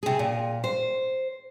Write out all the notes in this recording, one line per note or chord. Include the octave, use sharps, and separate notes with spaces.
C3 G#4
A#2
C5